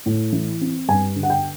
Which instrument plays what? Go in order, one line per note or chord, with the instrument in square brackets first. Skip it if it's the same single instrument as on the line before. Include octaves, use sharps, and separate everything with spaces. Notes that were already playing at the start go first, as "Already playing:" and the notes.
[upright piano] A2
E3
C4
G2 G#5
D3
F#5
G5